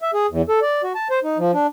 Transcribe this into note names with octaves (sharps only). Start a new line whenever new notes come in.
E5
G#4
E2
A4
D5
F#4
A5
C5
D#4
F3
D4